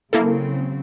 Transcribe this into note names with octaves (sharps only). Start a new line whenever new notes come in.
C#3 F#3 A#3 C4 E4 A4